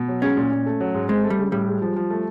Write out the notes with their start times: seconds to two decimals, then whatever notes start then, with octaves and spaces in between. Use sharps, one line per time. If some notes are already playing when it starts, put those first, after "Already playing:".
Already playing: B2
0.08 F#3
0.22 G#3 C#4
0.37 A#2
0.52 A#2
0.66 A3
0.80 F#3
0.94 G#2
1.09 G#3 C4
1.24 A3
1.30 G3
1.39 C#3
1.52 A2 G3
1.67 G#3
1.82 F3
1.96 F3
2.10 A3